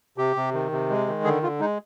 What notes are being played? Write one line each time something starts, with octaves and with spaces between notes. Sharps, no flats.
C3 G4
C3
D#3
C3
G#3
D#3
D3 G#4
D3 F4
G#3 D#4